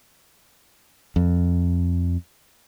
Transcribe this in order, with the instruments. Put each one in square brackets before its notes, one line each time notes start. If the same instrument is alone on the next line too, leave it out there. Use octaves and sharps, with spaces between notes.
[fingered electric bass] F2